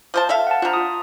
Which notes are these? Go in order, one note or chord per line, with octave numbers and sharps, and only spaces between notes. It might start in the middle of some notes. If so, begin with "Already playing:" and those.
F3 C5 A5
A4 E5 F5
F#5 A5
F3 D4 F4 A#5
F4 D#6